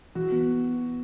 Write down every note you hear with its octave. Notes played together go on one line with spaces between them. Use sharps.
E3 F#4
B3